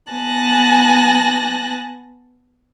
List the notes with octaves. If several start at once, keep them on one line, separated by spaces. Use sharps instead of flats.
B3 G#5 A5 F#6 A#6